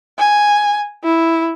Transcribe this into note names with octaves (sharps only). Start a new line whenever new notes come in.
G#5
E4